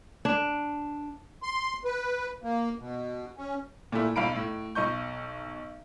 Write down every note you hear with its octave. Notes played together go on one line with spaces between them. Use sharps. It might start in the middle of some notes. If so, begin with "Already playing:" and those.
D4
C6
B4
A#3
B2
C#4
A#2 A3 E4
B1 F5 B5 D7
A2
B1 D#5 C#6 G6